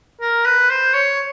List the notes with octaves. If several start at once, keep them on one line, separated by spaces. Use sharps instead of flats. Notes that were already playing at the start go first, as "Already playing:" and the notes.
A#4
B4
C5
C#5